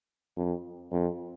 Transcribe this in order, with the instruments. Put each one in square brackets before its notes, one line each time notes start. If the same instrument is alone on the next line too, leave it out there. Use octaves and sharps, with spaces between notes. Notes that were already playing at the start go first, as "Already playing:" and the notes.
[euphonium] F2
F2